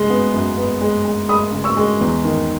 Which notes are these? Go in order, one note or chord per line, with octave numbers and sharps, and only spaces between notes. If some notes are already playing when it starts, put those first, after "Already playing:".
Already playing: C#3 G#3
B3
F#2
B3
G#3
G#3
G#3 B5 D#6
C#3
C#6 E6
G#3
E2
D#3